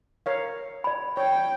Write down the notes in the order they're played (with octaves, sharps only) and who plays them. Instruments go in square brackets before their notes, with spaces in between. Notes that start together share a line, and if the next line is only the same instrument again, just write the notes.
[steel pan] A#4 C#5 F5
[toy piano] D5 B5
[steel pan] C#5 [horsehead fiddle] G5